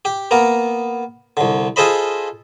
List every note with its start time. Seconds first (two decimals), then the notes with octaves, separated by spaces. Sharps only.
0.05 G4
0.31 A#3 B3 A#4
1.37 C2 D3
1.76 F4 G#4 A4 C5 D#5 B5